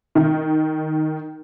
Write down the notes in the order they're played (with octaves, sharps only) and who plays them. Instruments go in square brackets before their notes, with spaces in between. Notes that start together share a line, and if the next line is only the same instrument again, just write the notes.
[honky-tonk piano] D#3